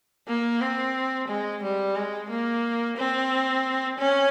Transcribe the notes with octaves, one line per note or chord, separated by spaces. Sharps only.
A#3
C4
G#3
G3
G#3
A#3
C4
C#4